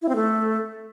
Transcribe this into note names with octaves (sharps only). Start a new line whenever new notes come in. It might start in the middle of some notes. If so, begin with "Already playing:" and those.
E4
C4
A3